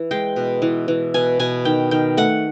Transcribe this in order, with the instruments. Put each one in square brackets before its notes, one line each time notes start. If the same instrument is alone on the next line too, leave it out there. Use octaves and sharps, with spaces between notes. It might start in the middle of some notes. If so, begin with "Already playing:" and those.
Already playing: [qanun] E3
G#3 G5
B2
E3
E3
B2 G#5
B2 G#5
D#3 G5
D#3 G5
A3 F#5